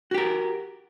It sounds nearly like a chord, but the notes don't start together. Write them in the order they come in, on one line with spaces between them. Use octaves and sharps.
F#4 G4 A#4